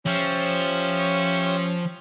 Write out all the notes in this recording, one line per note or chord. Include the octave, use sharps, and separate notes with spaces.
F3 C#4 G4 C#5 E5